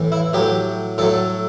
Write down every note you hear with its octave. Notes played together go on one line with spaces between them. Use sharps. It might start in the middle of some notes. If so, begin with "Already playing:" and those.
Already playing: A2 E3
E4
A2 F#3 G4
A2 F#3 A4